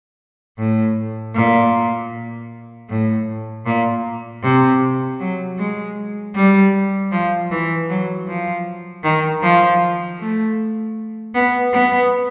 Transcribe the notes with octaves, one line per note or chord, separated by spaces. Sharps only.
A2
A#2
A2
A#2
C3
F#3
G#3
G3
F3
E3
F#3
F3
D#3
F3
A3
B3
B3